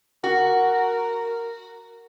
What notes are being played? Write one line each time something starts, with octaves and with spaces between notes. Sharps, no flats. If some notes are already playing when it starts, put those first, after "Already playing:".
F#4 A#4